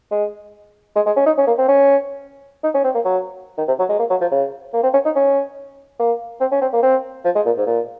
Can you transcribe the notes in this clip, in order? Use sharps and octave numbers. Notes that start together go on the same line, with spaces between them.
G#3
G#3
G#3
C#4
D#4
C#4
A#3
C4
C#4
D#4
C#4
C4
A#3
F#3
D#3
C3
F#3
G#3
A#3
F#3
F3
C#3
A#3
C4
C#4
D#4
C#4
A#3
C4
C#4
C4
A#3
C4
F3
G#3
A#2
G#2
A#2